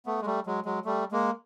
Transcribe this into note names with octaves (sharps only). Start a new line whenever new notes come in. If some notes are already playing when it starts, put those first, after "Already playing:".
A3 B3
G#3
G3 A3
F#3 G#3
F#3 G#3
G3 A3
G#3 A#3